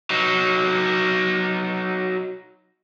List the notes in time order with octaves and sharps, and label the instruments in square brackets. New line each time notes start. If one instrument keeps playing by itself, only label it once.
[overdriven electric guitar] F#3 D#4